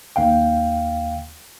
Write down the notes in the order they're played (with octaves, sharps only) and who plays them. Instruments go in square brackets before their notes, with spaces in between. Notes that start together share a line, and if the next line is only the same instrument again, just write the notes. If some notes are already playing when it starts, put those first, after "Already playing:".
[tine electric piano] D#2 F5 G5